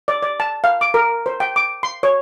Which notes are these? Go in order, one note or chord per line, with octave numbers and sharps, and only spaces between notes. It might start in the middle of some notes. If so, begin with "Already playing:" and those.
D5
D5
A5
F5
D6
A#4
C5
G5
D6
C6
C#5